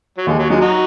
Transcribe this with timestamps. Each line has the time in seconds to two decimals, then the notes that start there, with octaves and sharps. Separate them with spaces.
0.17 F#3
0.27 D#2 G#3
0.38 F#3
0.50 F#3 G#3
0.61 D#4 F#4